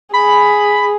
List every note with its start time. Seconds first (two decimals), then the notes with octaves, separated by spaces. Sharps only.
0.13 G#4 B5